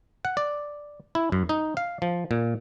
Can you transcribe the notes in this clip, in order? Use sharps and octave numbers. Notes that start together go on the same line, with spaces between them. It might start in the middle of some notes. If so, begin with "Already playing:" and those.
F#5
D5
E4
F#2
D#4
F5
F3
A#2